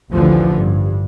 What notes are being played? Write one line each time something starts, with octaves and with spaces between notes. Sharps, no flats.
A1 D2 D3 E3 F3
G2